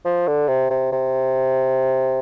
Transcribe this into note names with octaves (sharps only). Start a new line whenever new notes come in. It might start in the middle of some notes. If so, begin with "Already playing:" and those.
F3
D3
C3
C3
C3